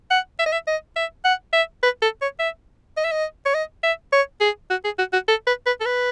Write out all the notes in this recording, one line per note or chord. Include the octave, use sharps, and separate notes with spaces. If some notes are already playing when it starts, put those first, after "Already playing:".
F#5
E5
D#5
E5
D#5
E5
F#5
E5
B4
A4
C#5
E5
D#5
E5
D#5
C#5
D#5
E5
C#5
G#4
F#4
G#4
F#4
F#4
A4
B4
B4
A4
B4